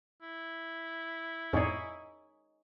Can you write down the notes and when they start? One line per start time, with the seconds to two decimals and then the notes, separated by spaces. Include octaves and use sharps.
0.22 E4
1.53 F2 A2 D#4 G#4 C#5 D5